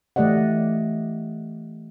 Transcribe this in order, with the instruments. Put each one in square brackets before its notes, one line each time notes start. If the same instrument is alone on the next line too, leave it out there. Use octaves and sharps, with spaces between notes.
[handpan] E3 A3 G4 D5 D#5 F#5